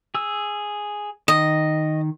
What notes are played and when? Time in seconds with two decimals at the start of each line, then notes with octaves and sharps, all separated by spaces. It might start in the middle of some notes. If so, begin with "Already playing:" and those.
0.15 G#4 E6
1.28 D#3 D#5